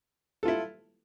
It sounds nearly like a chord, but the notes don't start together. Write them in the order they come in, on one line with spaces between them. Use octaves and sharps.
A4 F4 E4